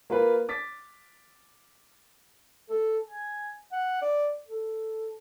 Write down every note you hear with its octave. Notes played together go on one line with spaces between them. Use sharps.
A#3 F4 A#4 B4
D6 A6 B6
A4
G#5
F#5
D5
A4